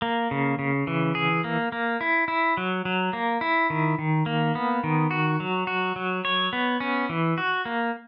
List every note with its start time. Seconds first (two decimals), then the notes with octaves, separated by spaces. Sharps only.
0.02 A#3
0.31 C#3
0.59 C#3
0.87 E3
1.15 G#4
1.44 A#3
1.72 A#3
2.01 E4
2.28 E4
2.57 F#3
2.85 F#3
3.13 A#3
3.41 E4
3.70 D#3
3.99 D#3
4.26 A#3
4.55 B3
4.84 D#3
5.11 F#4
5.40 F#3
5.67 F#4
5.96 F#3
6.25 C#5
6.53 B3
6.80 C#4
7.09 E3
7.38 F#4
7.65 A#3